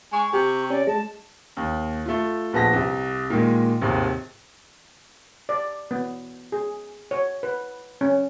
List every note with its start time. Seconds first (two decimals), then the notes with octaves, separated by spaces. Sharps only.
0.12 G#3 C#6
0.33 C3 G4
0.70 C#4 D5
0.87 G#3 A5
1.57 D#2
2.06 A3 F4
2.53 A#1 B3 A5 A#6 B6
2.73 C2
3.30 A#2 D#3 G#3
3.81 G#1 D#2 C3
5.49 D5
5.91 B3
6.52 G#4
7.11 C#5
7.43 B4
8.01 C#4